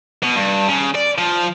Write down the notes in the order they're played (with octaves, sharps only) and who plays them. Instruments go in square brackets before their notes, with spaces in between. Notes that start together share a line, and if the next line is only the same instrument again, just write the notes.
[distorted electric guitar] B2
G2
C#3
D5
F3